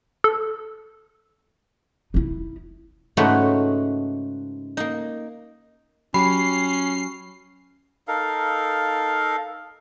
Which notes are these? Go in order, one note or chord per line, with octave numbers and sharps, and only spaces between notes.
A4
D#4 E4
G#2 C#3 A3 D#4 F#4 B4
A#3 D#4
F#3 C#4 G4 B5 C7
D#4 A4 A#4 F5